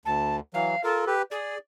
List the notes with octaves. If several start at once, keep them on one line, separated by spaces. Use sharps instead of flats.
D2 A5
E3 F#3 F5
F4 A4 A#4
G4 B4
G#4 D5